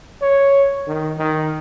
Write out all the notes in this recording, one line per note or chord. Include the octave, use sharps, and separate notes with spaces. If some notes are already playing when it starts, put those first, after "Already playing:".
C#5
D#3
D#3